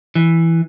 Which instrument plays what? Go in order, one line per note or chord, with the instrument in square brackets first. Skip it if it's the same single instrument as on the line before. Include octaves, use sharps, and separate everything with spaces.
[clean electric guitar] E3